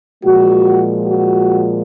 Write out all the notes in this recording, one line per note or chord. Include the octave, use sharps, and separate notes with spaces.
A#2 F3 G#3 F#4
F#4